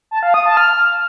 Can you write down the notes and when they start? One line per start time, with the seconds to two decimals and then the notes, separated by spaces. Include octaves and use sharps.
0.11 A5
0.23 F5
0.34 D#6
0.46 A5
0.57 F6